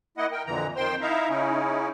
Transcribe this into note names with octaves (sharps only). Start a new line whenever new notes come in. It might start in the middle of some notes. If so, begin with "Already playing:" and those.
A#3 E4 D#5 F#5
A#4 G5
F2 A#2 D3 E3 A#5
F2 D#3 C5 G5 C6
D#4 E4 E5 F5 A#5
C#3 C#4 D#4 E4